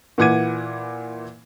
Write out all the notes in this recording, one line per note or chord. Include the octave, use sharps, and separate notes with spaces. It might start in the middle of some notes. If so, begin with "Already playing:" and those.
A#2 E3 F#5 D6 G#6 D#7